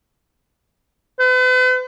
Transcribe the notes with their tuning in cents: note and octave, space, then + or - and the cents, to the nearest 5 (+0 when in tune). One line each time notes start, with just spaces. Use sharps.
B4 +45